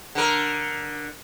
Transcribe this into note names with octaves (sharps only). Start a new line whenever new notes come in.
D3 A#4